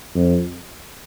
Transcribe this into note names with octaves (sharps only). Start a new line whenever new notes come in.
F2